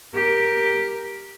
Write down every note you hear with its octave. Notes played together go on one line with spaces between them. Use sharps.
G4 A#4